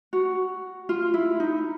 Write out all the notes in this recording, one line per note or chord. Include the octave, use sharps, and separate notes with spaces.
F#4
F4
E4
D#4